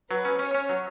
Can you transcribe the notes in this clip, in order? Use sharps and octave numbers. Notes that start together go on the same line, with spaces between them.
F#3 B4
C#4
C#4 C#5
C#4
F#3